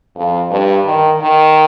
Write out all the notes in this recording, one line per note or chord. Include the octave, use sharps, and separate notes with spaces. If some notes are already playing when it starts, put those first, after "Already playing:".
F2
G2
D#3
D#3